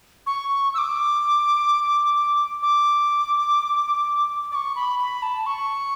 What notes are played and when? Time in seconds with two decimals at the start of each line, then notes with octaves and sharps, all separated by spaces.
0.27 C#6
0.74 E6
0.78 D6
2.63 D6
4.52 D6
4.55 C#6
4.76 B5
4.99 B5
5.23 A5
5.46 C#6